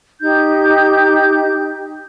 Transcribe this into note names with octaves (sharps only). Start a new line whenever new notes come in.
D#4 G4 G6